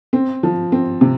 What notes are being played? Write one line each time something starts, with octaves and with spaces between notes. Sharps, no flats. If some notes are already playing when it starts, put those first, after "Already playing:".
C4
F3
C4
C3